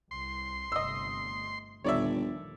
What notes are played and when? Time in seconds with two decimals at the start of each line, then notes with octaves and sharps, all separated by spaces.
0.11 C2 C6
0.72 G1 C3 A3 D#5 E6
1.84 G1 D#2 A#2 F3 C#5 D5 E5